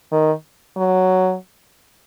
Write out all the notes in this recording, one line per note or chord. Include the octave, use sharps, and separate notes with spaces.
D#3
F#3